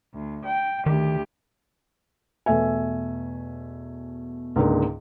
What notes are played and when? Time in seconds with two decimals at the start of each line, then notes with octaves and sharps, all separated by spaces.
0.14 D2
0.45 G5
0.86 D2 D#3 G4
2.46 E2 B2 A3 E5 G#5
4.56 C#2 G#2 D3 A#3